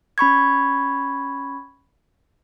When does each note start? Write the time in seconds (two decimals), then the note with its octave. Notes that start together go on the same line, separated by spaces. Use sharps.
0.18 C#4 B5 C#6 G#6